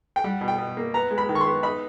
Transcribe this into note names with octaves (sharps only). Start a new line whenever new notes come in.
G5
G3 F#5
B2
G5
B2
A#3
B3 A#5
G#3
B5
D#3
C#6
C6
B3
D#4 B5